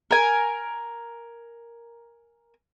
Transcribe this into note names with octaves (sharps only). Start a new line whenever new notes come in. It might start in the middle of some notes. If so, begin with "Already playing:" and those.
A#4 G#5